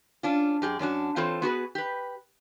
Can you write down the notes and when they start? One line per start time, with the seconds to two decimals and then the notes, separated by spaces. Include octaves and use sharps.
0.23 C#4 D4 F4
0.62 F#2 G4 G#4
0.79 F#2 C#4 D4 F#4
1.16 E3 C4 F4 A4 C5 C#5
1.42 B3 F#4 G#4 B4
1.75 G4 B4